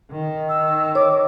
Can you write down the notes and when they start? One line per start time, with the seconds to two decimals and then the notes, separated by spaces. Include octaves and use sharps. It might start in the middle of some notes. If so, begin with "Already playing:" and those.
0.11 D#3
0.49 E6
0.95 C#5 D6